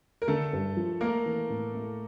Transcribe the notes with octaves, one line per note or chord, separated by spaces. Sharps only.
A#4
D3 A3 A4
G2
F3
A3 A#3 A#4
E3
A2
A3